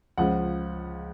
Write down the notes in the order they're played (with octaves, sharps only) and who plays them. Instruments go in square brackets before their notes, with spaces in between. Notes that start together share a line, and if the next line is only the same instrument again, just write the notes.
[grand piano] C#2 C#3 F3 F#5